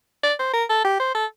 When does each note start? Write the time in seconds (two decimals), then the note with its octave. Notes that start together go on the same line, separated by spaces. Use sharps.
0.23 D5
0.39 C5
0.53 A#4
0.70 A4
0.85 G4
1.00 C5
1.14 A4